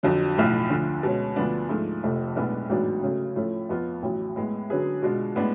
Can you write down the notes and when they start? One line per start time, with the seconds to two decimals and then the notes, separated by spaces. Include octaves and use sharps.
0.03 F2 D3 F#3
0.37 B1 A2 F3
0.70 D2 D3 F3
1.03 B2 G#3 C#4
1.36 D2 D3 F3 B3 D4
1.69 G#2 F3 A3 D4
2.03 F1 F2 F3 A3
2.36 B1 A2 G#3 B3 D4
2.69 A1 G#2 F#3 B3 D4
3.03 C#3 F#3 A3
3.36 A2 F3 A3 C#4 F4
3.69 F2 F3 B3 F4
4.02 A1 A2 F#3
4.36 A2 G#3 B3
4.69 D3 F#3 C#4 G#4 B4
5.02 B2 G#3 D4 F4
5.36 A2 G#3 B3 D4